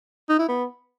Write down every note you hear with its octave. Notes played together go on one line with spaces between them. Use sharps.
D#4
E4
B3